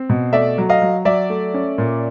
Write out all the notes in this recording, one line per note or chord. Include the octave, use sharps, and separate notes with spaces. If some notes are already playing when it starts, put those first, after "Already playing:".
Already playing: C4
B2
A3 D5 E5
F#3
D#5 F5
F#3
F#3 D5 E5
A3
C#4
A#2